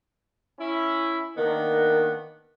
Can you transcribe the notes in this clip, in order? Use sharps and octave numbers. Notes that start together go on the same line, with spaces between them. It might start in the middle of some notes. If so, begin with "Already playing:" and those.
C#4 E4
D#3 A#3 B3 D4